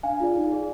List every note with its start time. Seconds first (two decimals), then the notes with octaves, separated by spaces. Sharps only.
0.03 D4 F5 G#5
0.20 F4 G#4 D5
0.35 D#4
0.52 G#4 D5